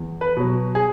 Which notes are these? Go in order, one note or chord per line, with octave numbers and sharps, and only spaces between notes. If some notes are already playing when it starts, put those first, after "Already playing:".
Already playing: E2
B4
B2 F#3
G#4